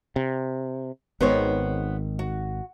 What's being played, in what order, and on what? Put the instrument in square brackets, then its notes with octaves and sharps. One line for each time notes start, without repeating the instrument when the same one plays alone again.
[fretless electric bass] C3
[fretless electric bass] G#1 D#3 G#3 [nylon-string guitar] B3 C5 C#5
[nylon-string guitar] F#4